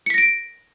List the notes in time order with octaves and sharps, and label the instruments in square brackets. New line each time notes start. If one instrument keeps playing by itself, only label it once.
[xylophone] C#7
B6
A#6
D7